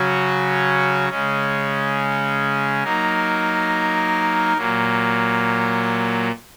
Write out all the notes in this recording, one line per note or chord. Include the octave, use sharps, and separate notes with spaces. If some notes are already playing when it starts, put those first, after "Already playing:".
Already playing: C#3 F#3 C#4 F#4
C#3 G#3 C#4
F#3 A#3 D#4 A#4
A#2 F#3 A#3